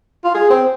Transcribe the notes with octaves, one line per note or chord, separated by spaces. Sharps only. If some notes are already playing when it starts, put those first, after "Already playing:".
F4
G#4
C4